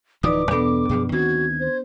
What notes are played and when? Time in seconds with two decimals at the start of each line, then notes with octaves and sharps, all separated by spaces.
0.23 D1 E3 F3 D#4 B4 D5 D6 D#6
0.51 E2 G2 B2 B3 D4 A4
0.89 F#2 B2 F3 G#4
1.12 D2 D#3 C4 F#4 G#6
1.60 C5